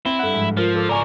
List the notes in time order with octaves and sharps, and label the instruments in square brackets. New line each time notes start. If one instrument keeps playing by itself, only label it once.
[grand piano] C4 G7 [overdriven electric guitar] E4
[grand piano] G2 F#5 [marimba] A4 F#6
[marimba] G#2 F3 G#3
[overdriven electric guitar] F3 [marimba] F4 A#4
[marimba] G#2 D6 [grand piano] A4
[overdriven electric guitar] C#2 A#4 [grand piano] D5 G#5 C#6